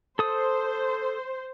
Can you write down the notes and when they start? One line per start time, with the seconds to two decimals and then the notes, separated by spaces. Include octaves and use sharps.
0.19 A4 C5 D#6